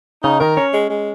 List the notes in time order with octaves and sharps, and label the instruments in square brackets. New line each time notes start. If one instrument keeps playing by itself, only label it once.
[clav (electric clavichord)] C#3 [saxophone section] D#4
[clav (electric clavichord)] D#3 [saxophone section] A#4
[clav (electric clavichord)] C#4 [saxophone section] C#5
[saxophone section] G#3
G#3